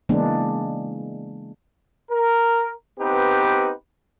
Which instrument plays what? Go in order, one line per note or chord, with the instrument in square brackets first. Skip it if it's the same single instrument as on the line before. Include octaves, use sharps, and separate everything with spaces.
[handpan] C#3 E3 G#3 A#3 B3 D4
[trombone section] A#4
B3 C4 D#4 G4 B4